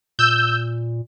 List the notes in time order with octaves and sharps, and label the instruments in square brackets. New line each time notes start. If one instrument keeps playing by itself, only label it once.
[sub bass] A#2 [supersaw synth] E6 G6